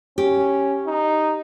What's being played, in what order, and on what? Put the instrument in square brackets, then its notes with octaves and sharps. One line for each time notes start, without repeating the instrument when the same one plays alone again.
[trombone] C#4 [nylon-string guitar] G4
[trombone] D#4